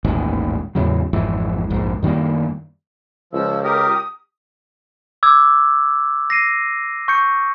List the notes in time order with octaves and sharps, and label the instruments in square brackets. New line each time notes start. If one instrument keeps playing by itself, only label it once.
[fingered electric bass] D#1 A1 D#2 G#2
E2 A2 C#3 F#3
G#1 F2 G#2 E3
A#1 F2 G#2
F#2 D#3 G3 A#3
[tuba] C#2 [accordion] F3 [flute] E6
[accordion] G4 A#4 [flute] D#6
[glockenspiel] D6 E6 G#6
A#6 C7 D#7
C#6 G6 C#7